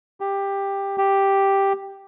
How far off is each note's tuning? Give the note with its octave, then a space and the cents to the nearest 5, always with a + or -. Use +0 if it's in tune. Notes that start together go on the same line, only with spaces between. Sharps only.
G4 +10
G4 +0